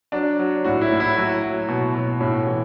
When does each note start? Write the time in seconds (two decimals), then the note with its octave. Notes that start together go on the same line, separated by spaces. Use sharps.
0.12 F#3 D4
0.39 F#3
0.64 A2 F#4
0.81 E4
0.91 A2
1.00 E4
1.17 F#3 F#4
1.42 F#3
1.68 B2
1.95 B2
2.20 A2
2.47 E3